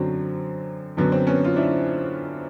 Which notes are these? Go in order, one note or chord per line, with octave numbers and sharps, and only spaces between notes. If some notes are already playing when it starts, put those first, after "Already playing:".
Already playing: F#2 D3 F#3 C4
F#2 D3 F#3 B3
C4
B3 C#4
F4
D4 E4